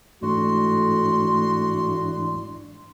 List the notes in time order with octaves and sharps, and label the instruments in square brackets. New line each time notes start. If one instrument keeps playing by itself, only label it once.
[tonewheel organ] G#2 E3 D4 [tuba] A3 [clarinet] F#4 [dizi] C6